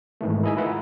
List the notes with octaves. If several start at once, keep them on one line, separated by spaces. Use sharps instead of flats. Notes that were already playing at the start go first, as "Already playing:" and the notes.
G#2 D#3 E3 A3
E4 G#4 D#5 G#5 B5
E4 F4 A#4 B4 F#5 A#5